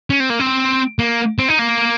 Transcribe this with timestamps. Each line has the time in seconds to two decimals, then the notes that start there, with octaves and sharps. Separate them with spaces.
0.10 C#4
0.20 C4
0.30 A#3
0.40 C4
0.99 A#3
1.39 C4
1.49 D#4
1.59 A#3